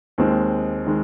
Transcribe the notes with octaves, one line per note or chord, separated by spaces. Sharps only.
D#2 D#3 G#3 C4
D#3 G#3